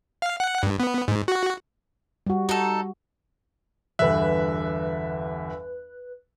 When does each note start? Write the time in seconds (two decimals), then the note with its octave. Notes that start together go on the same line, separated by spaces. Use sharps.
0.22 F5
0.40 F#5
0.63 G2
0.80 B3
1.08 G#2
1.28 F#4
2.26 G3 F#4
2.49 D#4 F#4 A4
3.99 G1 E2 G2 B4 E5 F#6